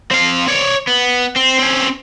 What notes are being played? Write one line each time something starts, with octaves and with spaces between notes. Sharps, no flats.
C4 F5
C#5 D5
B3
C4
C4 C#4